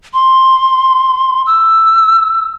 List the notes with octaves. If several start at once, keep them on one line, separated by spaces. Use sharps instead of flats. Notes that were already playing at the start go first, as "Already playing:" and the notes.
C6
E6